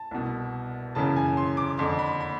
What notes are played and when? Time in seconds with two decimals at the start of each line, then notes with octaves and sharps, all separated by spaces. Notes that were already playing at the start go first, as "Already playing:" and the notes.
Already playing: A5
0.11 C2 B2
0.95 F#2 C#3 E3 A5
1.16 G#5
1.37 C6
1.57 D6
1.78 F2 D3 C6
1.99 B5
2.20 B5